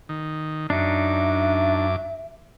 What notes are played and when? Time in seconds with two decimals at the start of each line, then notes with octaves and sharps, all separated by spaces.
0.09 D#3
0.70 F#2 D4 D#4 E5 D6